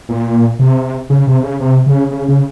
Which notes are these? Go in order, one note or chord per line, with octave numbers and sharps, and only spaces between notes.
A#2
C3
C#3
C3
C#3
C3
C#3
C#3
C#3